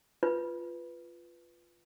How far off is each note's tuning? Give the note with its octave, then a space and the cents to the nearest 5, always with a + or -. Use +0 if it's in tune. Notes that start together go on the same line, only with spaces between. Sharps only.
F4 -10 B4 +0